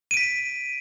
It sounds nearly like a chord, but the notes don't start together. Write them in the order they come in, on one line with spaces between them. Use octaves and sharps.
D#7 D7 B6